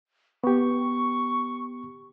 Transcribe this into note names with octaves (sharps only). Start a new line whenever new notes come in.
B3 G4 C#6